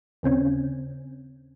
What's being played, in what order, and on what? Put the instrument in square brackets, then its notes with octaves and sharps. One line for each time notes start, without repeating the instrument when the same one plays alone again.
[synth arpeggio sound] D#2 C#3 C4 C#4